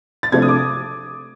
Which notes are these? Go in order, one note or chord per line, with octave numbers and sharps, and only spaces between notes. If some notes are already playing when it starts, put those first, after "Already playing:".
A6
C3 F3 A3 D4 G#6
D#6
D6